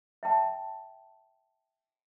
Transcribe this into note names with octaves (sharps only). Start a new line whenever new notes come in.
E5 G5 A5